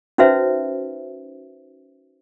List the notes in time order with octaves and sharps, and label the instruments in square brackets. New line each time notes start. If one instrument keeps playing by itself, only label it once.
[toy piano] C#4 D#4 F#4 B4 C5 E5